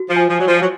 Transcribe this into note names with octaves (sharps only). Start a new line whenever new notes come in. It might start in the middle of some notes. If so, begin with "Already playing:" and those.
Already playing: F#4
F3
G#5
F3
F#3 D5
F3
F#3